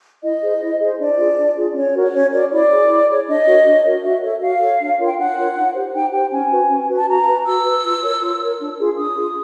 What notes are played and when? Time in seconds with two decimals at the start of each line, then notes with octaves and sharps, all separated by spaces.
0.23 E4 D#5
0.42 G#4 C5
0.61 E4
0.80 G#4 C5
0.99 D4 D5
1.18 F4 G#4
1.37 D4
1.56 F4 G#4
1.75 C#4 C#5
1.94 F#4 A#4 C#5
2.13 C#4 C#5
2.32 F#4 A#4 C#5 D5
2.51 E4 D5
2.70 G#4 C#5
2.89 E4
3.09 G#4 C#5
3.27 D4 D#5
3.46 F#4 A#4 C#5
3.65 D4
3.84 F#4 A#4 C#5
4.03 F#4 E5
4.22 A4 C#5 E5
4.41 F#4 F5
4.60 A4 C#5
4.79 D4
4.99 F4 A#4 C#5
5.05 G5
5.17 D4 F#5
5.36 F4 A#4 C#5
5.56 D#4
5.74 G4 C5
5.93 D#4 G5
6.12 G4 C5 G5
6.31 C#4 G#5
6.51 F#4 B4
6.69 C#4
6.89 F#4 B4
6.97 A5
7.08 F#4 A#5
7.27 B4
7.45 F#4 E6
7.65 B4
7.84 F4
8.02 A#4 C#5
8.21 F4
8.41 A#4 C#5
8.60 D4
8.79 F4 G#4
8.97 D4 D#6
9.17 F4 G#4